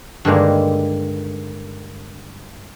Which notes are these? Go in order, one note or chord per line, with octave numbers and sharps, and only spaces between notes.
G2 D3 D#3 G3 G#3 A#3